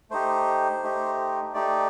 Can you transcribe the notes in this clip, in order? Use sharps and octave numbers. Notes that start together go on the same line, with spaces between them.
A3 D#4 G4 C5
A3 D#4 G4
A3 D#4 G4 D5